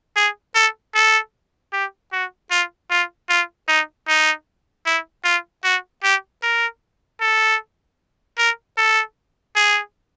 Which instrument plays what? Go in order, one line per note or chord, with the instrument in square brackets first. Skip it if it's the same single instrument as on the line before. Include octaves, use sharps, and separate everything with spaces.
[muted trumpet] G#4
A4
A4
G4
F#4
F4
F4
F4
D#4
D#4
E4
F4
F#4
G4
A#4
A4
A#4
A4
G#4